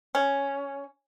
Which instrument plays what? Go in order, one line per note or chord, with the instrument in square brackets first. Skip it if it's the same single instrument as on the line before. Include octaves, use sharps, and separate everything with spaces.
[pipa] C#4